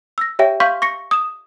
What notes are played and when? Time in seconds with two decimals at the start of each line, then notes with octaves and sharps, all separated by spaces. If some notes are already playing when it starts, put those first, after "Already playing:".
0.18 E6 A#6
0.39 G4 C#5 E5 G5
0.60 F5 C6 C#6 F6 G6 B6
0.82 C#6 A#6 C#7
1.11 D#6 E7